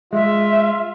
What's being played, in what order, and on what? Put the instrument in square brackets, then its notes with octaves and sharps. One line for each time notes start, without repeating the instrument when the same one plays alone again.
[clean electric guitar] G#3 [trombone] F4 [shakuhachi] E5